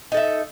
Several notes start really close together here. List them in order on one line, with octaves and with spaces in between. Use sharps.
D#4 A4 E5